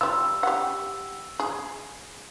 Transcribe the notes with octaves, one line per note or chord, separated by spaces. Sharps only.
G3 F4 E6
G4 F#5
G#4